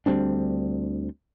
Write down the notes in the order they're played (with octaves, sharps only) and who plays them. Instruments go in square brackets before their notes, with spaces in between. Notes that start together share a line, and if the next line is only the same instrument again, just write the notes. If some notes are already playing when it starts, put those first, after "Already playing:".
[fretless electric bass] D2 G3 C4 D4